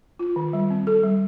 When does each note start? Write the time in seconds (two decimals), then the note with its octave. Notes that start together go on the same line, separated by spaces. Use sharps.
0.19 F4
0.36 D#3
0.53 G3
0.70 C4
0.87 A4
1.03 G3